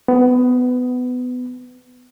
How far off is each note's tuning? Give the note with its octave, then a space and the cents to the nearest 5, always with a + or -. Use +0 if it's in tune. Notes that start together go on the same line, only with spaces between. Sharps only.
B3 +20